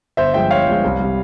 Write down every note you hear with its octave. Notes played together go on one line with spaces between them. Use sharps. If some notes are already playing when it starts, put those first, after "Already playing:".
G1 C5 E5
G2 F3 G#3 E5 G5
G1 C#5 F5
G2 F3 G#3
C2
C3 G3